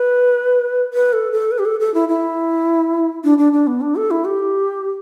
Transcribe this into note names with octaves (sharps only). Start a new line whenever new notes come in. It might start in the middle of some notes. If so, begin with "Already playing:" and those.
Already playing: B4
B4
A4
A4
B4
G4
A4
A4
E4
E4
D4
D4
D4
B3
D4
A4
E4
G4